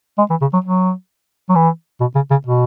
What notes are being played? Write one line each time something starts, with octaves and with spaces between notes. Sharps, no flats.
G#3
E3
C#3
F#3
F#3
F#3
E3
B2
C#3
C#3
B2